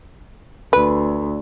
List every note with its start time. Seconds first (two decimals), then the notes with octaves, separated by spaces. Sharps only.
0.73 D2 B4